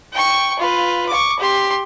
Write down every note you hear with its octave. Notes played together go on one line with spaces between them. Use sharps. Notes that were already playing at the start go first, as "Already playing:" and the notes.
G5 C#6
F4 B4
C#6 D6
G4 C6